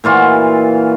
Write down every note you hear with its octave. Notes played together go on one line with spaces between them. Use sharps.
A#2 E3 F4 F#4